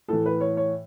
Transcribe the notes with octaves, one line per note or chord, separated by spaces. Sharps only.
A2 E3 A4
B4
C#5
C#5